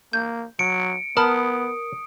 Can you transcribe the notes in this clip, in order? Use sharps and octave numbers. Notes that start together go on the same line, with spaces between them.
A#3 G6
F#3 C#7 D7
B3 A#4 A5 B5 D#6 F6